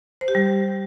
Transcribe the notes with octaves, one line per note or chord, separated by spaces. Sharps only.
C5
G4
G3